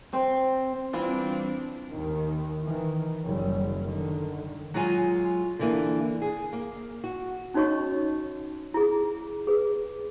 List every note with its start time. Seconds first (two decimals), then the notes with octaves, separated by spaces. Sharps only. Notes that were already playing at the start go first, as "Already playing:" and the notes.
0.13 C4
0.93 E3 G3 C4 D4 F4
1.90 D#2 D#3
2.62 D#3 E3
3.24 F#1 G3
3.84 D3 D#3
4.74 F#3 G#3 F4 G#5
5.59 D3 E3 A#3
6.22 G#4
6.53 A#3
7.04 F#4
7.54 C#4 D#4 F#4 C#5 D#5 C#6
8.74 E4 G#4
9.47 G#4 B4